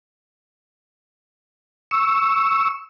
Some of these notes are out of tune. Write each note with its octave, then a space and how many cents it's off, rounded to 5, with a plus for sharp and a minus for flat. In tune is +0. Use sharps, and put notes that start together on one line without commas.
C#6 +0 E6 +0